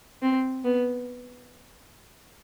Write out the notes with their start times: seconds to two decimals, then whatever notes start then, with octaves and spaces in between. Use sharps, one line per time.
0.22 C4
0.64 B3